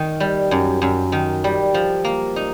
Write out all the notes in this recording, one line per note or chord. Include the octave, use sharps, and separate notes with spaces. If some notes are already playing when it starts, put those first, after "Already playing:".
Already playing: D#3
G3
F#2
F#2
D#3
G3
F3
A#3
D#4